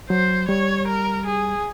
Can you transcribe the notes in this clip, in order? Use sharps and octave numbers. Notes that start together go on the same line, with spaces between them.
F#3 C5
G3 C#5
A#4
G#4